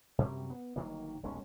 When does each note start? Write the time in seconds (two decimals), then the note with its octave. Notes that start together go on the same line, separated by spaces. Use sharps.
0.18 F#2 C3 F#3 G3
0.50 B3
0.76 G1 D#3 F#3 A#3
1.23 D#1 B1 G#3 C#4